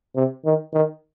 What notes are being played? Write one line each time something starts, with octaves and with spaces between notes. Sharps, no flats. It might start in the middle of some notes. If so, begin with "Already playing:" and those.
C3
D#3
D#3